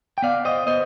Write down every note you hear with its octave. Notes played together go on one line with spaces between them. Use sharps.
G5
B3 D5 F5
C5 D#5
B3 C5 D#5